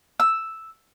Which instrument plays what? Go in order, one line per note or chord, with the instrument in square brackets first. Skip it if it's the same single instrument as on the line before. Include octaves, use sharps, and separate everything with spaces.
[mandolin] E6